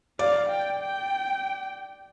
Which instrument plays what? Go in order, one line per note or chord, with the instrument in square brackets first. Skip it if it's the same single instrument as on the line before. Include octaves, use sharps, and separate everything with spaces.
[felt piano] D5 [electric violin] F5
[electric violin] G5
G5